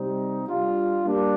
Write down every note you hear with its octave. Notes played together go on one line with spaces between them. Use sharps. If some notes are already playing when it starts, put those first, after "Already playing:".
Already playing: C3 G3 C4 D#4
G3 D4 F4
G3 A#3 D4